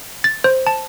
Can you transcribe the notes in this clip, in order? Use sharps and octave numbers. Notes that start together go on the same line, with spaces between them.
A6
C5
A5